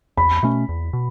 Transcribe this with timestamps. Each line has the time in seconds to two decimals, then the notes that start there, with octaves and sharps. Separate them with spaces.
0.17 E2 B5
0.43 B2 A3 C#4
0.69 E2
0.93 B2